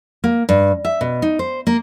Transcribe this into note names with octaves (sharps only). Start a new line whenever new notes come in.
A#3
G2
E5
B2
D#4
C5
A#3